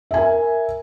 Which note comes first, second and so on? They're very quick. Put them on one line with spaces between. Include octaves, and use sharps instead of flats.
E5 G#5 A#4